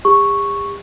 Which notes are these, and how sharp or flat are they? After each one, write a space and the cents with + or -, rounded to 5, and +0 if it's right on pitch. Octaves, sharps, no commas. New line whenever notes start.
G4 +45 C#6 +0